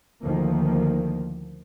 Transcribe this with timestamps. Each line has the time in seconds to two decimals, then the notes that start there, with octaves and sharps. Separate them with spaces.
0.22 D2 D#3 F3 A#3